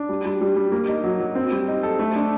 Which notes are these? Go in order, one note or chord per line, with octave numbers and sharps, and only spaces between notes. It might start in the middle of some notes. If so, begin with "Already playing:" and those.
Already playing: D4
G3
G3
G3
G3
A#3
D#4
F#3
F#3
C4
G3
D#4
A4
A3
D4